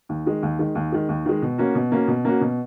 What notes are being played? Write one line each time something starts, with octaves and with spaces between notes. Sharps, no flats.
D#2
D#3 G#3
D#2
D#3 G#3
D#2
D#3 G#3
D#2
D#3 G#3
B2
A#3 C#4 F#4
B2
A#3 C#4 F#4
B2
A#3 C#4 F#4
B2